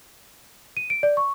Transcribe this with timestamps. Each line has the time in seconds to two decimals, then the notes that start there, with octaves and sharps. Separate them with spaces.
0.77 D#7
0.90 D7
1.03 D5
1.17 C#6